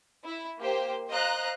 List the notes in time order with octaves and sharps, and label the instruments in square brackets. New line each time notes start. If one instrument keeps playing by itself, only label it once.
[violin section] E4
A#3 G4 C5
C5 D#5 F5 A#5 F#6